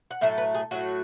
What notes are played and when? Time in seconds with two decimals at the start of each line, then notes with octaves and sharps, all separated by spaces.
0.11 F#5
0.21 A2 F#3 A3 E5
0.38 B4
0.54 G#4
0.71 A2 F#3 A3 F#4